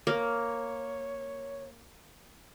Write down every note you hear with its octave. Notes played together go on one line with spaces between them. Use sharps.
A#3 C#5